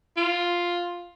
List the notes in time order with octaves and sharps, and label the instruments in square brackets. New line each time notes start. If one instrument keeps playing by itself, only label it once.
[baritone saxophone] F4